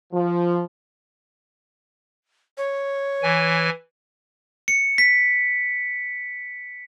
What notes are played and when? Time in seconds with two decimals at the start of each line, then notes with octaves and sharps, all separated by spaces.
0.13 F3
2.58 C#5
3.23 E3 G#5
4.68 C#7
4.98 B6